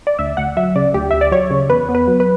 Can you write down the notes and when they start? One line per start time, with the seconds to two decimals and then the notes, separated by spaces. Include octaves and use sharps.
0.07 D5
0.19 D2 E5
0.37 D2 F#5
0.57 F#3 E5
0.75 C#3 D5
0.94 D2 G4
1.11 D2 E5
1.21 D5
1.32 F#3 C#5
1.51 C#3
1.70 E2 B4
1.89 B3
1.95 B4
2.07 F#3
2.20 B4